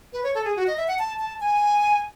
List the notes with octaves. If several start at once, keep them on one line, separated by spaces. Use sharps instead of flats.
B4
C#5
A4
G#4
F#4
D#5
E5
F#5
A5
A5
G#5